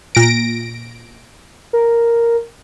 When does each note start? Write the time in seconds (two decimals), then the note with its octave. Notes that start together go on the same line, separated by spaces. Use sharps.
0.15 A#2 A#6 D7
1.73 A#4